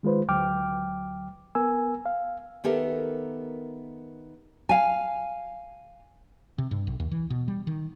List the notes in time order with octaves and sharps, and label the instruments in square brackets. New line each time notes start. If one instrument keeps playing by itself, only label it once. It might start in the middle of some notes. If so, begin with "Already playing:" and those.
[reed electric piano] D#3 G#3 F4 B4 C5
D2 F#3 G5 D6 F6
B3 A#4 G#5 E6
F5
[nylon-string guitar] D#3 B3 G4 A4 A#4 E5
F5 G#5
[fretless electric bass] C3
G2
B1
D#2
E3
B2
G3
D#3